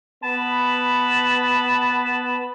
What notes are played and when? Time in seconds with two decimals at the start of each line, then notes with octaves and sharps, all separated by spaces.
0.23 B3 A5 B5